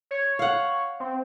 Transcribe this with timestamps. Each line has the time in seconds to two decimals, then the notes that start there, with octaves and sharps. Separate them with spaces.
0.11 C#5
0.39 F5 F#5
1.00 C4